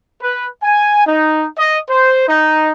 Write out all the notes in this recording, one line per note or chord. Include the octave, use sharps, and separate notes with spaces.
B4
G#5
D#4
D#5
C5
D#4